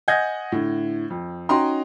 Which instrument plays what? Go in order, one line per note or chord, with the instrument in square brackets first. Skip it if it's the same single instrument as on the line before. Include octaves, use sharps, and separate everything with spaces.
[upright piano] D#5 F#5 G#5 G6 G#6 A#6
A2 D3
F2
C#4 D#4 F#4 G5 A#5 C6